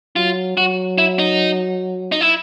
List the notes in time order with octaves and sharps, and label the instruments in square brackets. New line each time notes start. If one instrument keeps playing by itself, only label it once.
[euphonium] F#3 [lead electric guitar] F4
[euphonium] F#3 [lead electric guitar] F#4
[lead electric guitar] E4
D#4
D#4
E4